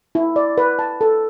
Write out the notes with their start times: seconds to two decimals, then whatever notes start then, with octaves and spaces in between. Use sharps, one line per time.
0.15 E4
0.36 D5
0.58 B4
0.79 A5
1.01 A4